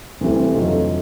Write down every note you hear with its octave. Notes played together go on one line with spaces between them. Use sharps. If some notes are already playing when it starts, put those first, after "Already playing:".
D2 C3 E3 G3
F2 D3 F#3 A3 D#4 F4